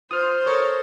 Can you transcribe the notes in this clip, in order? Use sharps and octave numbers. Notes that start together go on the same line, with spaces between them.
F4 C5 D#6 F6
A4 A#4 C#5